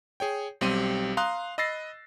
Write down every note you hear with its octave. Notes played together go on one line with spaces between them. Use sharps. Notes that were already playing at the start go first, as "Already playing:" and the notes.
G#4 C#5 G5
B1 G3 C4 G4 C6 D#7
F5 A#5 C6 D#6 F#6
D#5 B5 E6 A6 A#6 C7